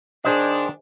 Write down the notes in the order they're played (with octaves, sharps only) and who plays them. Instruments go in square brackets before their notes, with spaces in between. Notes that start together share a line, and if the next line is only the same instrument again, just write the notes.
[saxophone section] D#3 D4 [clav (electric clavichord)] G#4 C5 D#5